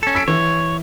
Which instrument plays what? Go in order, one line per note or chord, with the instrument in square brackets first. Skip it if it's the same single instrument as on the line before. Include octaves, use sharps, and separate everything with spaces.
[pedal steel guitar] C#4 A4
[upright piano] E6 B6 D7
[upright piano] E3 [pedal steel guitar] C#5